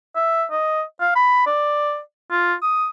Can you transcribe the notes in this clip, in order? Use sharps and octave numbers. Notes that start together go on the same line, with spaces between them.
E5
D#5
F5
B5
D5
F4
D#6